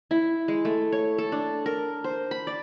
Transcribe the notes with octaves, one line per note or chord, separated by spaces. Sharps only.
E4
G#3
A3
C#5
A4
D4
A#4
C5
B5
D5